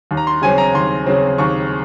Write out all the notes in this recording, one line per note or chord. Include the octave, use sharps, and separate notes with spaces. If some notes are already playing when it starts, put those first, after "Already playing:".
D#2
A#5
C6
C#3 F#3 C4 G#5
A#5
D#2 C6
C#3 F#3 C4
D#2 C#6